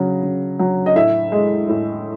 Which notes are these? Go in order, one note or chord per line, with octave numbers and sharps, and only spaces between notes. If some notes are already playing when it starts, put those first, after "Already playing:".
Already playing: C#3 F#3
C#3
F#3
D#5
A2 E5
G#3
A2